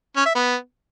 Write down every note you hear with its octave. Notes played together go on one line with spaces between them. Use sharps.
C#4
E5
B3